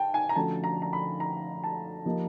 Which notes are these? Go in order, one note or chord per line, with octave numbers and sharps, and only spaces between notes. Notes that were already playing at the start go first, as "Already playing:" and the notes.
Already playing: G5 A5
G#5
A#5
D3 F3 A3 C#4 F#4 A5
A#5
A#5
B5
A#5
A5
F3 A#3 D#4 G4 A#4